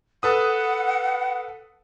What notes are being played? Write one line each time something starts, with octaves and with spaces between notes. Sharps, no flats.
A4 B4 F#5 D#6